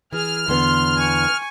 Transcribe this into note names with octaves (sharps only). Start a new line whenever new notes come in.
E3 G#4 F6
E2 D3 B3 C6
G#5 C#6